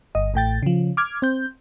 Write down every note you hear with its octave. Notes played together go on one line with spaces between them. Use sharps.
G1 D#5
A1 A2 G5 A6
C#3 F3
D6 F6 G#6
C4 G6